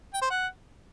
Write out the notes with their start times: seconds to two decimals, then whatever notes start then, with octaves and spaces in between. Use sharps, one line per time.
0.14 G5
0.22 C5
0.30 F#5